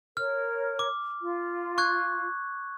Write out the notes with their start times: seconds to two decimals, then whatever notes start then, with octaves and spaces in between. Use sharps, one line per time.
0.17 A#4 C#5 F6
0.79 D6
1.22 F4
1.78 C#6 F#6 G#6